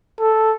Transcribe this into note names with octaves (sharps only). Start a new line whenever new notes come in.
A4